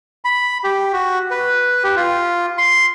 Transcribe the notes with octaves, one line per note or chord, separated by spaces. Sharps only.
B5
G4
F#4
B4
G4
F4
C6